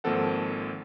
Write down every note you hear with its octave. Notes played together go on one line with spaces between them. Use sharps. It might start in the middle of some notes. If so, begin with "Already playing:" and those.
G#1 F3 A#3 C4 A4 F#5